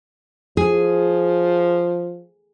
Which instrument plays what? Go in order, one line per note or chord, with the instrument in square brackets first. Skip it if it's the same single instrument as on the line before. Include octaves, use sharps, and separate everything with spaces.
[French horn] F3 [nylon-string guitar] G#4